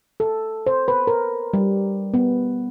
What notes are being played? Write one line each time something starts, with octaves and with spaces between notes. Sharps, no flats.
A4
C5
B4
A#4
G3
B3